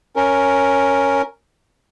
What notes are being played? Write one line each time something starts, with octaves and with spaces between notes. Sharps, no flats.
C#4 A#4